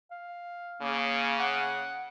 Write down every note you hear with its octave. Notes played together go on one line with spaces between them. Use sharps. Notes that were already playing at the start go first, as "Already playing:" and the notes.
F5
C#3 A#3
F#5